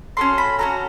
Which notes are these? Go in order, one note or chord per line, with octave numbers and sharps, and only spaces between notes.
C#4 F#4 A4 C6
B5
C#4 F#4 A4 A#5